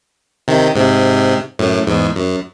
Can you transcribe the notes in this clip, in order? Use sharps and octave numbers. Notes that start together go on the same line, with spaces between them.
C3 D#3
G#2 C3
F#2 A2
E2 G#2
F#2